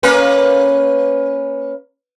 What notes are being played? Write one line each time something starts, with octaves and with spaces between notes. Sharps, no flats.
A#3 C#4 B4